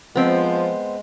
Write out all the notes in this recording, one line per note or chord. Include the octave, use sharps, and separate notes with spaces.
F3 G#3 B3 C4